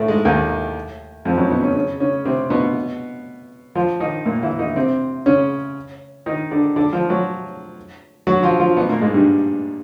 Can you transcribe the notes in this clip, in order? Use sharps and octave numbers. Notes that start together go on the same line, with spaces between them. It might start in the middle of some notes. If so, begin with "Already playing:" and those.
Already playing: A2 A3
G#2 G#3
D#2 D#3
F2 F3
F#2 F#3
B2 B3
C#3 C#4
C#3 C#4
C#3 C#4
C3 C4
B2 B3
F3 F4
D#3 D#4
A#2 A#3
E3 E4
D#3 D#4
C3 C4
C#3 C#4
D#3 D#4
D3 D4
D3 D4
F3 F4
F#3 F#4
F#3 F#4
F3 F4
F3 F4
B2 B3
A#2 A#3
G#2 G#3
G2 G3